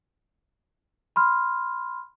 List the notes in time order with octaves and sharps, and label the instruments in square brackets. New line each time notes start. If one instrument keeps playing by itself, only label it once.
[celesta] B5 C6 F6